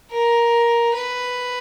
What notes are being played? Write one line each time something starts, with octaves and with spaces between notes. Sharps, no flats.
A#4
B4